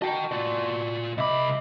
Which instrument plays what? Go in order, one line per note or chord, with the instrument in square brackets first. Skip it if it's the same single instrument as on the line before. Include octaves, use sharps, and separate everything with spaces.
[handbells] F#4 A5 [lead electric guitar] D#5 G5
[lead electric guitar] F4 D5
[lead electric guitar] C2 B5 [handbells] D#5 E5 D6